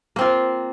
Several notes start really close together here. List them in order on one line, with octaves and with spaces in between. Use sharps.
A#3 C4 F4